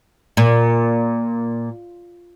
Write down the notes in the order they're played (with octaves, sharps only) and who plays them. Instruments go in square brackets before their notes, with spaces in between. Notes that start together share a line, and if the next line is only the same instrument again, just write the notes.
[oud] A#2